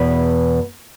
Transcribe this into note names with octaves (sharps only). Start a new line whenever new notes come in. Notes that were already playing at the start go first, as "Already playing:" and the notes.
Already playing: E2 B2 B4